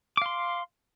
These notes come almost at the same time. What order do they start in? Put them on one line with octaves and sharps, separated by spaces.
D6 F5 C6